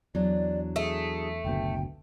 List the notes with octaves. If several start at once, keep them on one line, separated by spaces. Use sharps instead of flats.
E2 F#3 D4 D5
A3 G#4
F#1 D2 B2 G5